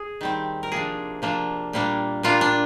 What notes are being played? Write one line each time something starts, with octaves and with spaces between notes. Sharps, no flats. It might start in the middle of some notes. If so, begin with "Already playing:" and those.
Already playing: G#4
D#3 G3 C4
A#4
C3 F3 A#3 D4 G#4
C3 F3 A#3 D4
A#2 G3 A#3 D4
A#2 G3 A#3 D4 F4
D4